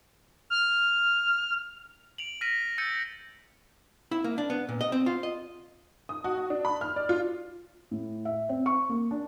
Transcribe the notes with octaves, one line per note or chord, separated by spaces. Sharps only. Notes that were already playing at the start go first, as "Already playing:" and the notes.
F6
D7 F7 F#7
F6 A#6 B6 D#7
E6 G6 A6 C#7 D#7
E4
A#3
D4
B3
A#2
D#5
C4
F4
D#5
D#6
F#4
F#4
D4
B5
F6
D5
F4
A2
E5
C4
C#6
A#3
D4